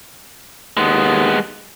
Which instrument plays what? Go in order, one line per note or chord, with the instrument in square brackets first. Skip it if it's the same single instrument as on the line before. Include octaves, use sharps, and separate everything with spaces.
[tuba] D#2 [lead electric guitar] G#3 B3